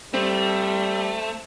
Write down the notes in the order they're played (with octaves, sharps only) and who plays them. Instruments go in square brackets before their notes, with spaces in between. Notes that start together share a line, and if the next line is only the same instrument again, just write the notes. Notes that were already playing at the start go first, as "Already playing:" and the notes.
[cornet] G3 [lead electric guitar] A3 [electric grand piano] C4